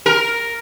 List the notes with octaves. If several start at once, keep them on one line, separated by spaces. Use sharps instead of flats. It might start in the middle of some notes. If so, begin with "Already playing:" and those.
A#4